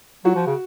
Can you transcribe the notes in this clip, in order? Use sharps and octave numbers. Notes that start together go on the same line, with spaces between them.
F#3 F#4
F3
C#3